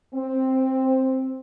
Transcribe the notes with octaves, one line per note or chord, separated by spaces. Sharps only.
C4